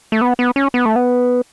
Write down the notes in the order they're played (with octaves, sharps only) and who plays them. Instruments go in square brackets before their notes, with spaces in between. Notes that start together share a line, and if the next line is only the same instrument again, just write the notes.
[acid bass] A3
B3
B3
C#4
B3
A3
B3